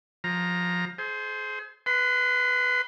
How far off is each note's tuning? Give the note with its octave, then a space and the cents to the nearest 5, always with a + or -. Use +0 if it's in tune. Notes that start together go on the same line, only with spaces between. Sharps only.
F3 +20 A#5 +0
G#4 +40 C5 +0
B4 +0 C6 -35